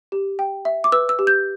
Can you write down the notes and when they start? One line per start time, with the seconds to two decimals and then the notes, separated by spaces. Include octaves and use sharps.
0.12 G4
0.39 G5
0.65 E5
0.84 D6
0.92 B4 E6
1.09 E6
1.19 G4
1.27 G6